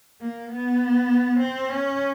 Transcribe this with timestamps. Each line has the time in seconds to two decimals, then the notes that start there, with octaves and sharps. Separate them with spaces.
0.21 A#3
0.51 B3
1.40 C4
1.70 C#4